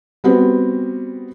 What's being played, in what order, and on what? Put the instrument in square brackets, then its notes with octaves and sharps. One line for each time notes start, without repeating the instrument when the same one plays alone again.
[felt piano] G3 B3 C4 F#4